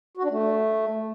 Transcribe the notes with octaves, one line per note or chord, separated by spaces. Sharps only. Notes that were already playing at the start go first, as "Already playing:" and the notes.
F#4
D4
A3